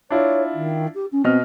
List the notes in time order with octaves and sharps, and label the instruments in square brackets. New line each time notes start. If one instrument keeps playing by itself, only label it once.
[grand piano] D4 E4 F4 [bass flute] C#5
[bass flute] D#3
G4
C#4
[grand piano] B2 D#5 F6 [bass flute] C4